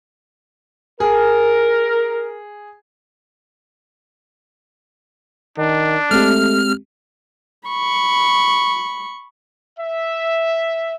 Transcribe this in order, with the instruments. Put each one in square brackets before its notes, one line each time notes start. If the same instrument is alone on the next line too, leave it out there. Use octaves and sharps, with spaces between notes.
[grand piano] G#4 [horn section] A#4
[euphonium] D#3 [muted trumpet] D4
[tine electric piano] G#3 C4 G4 [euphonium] A3 [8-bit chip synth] F6
[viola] B5 C#6
[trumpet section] E5